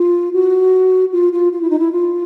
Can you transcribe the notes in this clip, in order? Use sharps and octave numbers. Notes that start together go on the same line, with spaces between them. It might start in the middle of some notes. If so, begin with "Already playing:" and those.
Already playing: F4
F#4
F4
F4
F4
E4
D#4
E4
F4